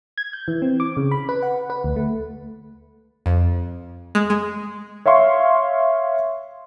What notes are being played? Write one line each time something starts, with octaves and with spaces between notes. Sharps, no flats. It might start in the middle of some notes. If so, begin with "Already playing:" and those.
G#6
G6
E3
C4
D6
C#3
B5
B4
F#5
B4
D2
A3
F2
G#3
G#3
C#5 E5 F5 C6 C#6